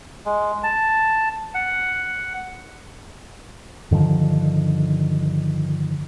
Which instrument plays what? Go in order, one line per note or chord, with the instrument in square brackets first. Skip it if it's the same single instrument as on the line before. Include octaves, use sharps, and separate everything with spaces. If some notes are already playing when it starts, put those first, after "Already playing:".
[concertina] G#3
A5
F#5
[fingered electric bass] G2 D3 D#3 F3